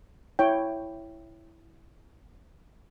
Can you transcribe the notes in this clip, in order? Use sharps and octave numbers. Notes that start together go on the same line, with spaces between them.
E4 C#5 G5